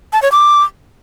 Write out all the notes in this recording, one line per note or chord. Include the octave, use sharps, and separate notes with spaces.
A5
C#5
D6